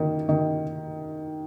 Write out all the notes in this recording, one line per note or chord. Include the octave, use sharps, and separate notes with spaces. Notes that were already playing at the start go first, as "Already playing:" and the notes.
Already playing: D#3 A#3
D#3